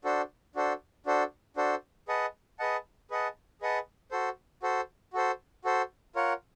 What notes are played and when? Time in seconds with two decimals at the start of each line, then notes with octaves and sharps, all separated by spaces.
0.04 D4 F#4 A4 C5
0.55 D4 F#4 A4 C5
1.06 D4 F#4 A4 C5
1.56 D4 F#4 A4 C5
2.08 G#4 B4 D#5 F#5 A5
2.59 G#4 B4 D#5 F#5 A5
3.10 G#4 B4 D#5 F#5 A5
3.61 G#4 B4 D#5 F#5 A5
4.11 F#4 A4 C5
4.63 F#4 A4 C5
5.13 F#4 A4 C5
5.64 F#4 A4 C5
6.15 F4 A#4 C#5 F#5